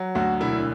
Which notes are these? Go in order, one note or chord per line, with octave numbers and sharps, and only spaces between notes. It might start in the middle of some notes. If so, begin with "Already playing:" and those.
Already playing: F#3
D2 F#4
E1 E4